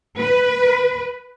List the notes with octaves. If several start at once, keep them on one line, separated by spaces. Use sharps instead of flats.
B4